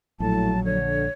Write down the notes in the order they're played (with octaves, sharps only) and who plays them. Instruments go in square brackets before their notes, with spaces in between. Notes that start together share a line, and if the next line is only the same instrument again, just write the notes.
[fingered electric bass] A#1 [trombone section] A2 [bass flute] F#3 [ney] A5
[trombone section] D3 [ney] C#5